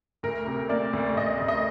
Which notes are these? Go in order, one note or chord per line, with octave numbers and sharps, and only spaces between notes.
D2 A#4
C3
A#3 D5
D2
D2 D#5
D2
D#5